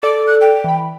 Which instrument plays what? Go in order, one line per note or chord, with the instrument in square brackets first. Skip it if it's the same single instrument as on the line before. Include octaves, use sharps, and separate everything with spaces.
[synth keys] A4 D5 [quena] D6
[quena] F#6
G5
[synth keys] E3 B5